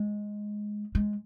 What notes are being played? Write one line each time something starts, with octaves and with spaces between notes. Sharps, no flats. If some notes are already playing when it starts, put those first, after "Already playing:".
Already playing: G#3
G#3